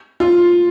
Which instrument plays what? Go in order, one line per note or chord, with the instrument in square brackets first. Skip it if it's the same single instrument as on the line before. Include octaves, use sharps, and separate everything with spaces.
[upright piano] F4